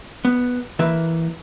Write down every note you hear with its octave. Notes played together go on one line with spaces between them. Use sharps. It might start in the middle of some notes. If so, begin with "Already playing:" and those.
B3
E3 A#3 B4 E5